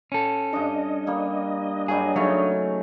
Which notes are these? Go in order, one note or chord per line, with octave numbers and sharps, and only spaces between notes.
C#4 A4
G2 D4 D#5 D6
G3 A#3
G2 F#3 G3 G#4
C#3 F#3 A3 C#4 D#4